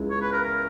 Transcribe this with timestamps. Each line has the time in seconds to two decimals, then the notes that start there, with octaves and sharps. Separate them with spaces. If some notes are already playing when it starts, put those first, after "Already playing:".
Already playing: C#2 C#3 G#3 C#4 E4
0.10 C#5
0.22 B4
0.33 A#4
0.44 A#4